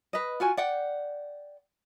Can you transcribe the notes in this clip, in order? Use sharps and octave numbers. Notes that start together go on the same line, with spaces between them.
B4 D#5
F4 F#4 G#5
D5 F#5 G5